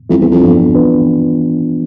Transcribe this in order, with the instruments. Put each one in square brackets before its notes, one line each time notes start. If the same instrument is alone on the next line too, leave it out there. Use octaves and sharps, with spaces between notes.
[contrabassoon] F2 [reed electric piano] E3 G3 C4 E4
[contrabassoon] E2
F2
[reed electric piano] G2 F3 B3 D4
E3 B3 D4 F4 B4